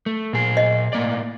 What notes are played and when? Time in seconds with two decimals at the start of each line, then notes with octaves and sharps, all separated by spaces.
0.06 A3
0.33 A#2 G#4
0.57 D#5
0.93 A2 A#3 D5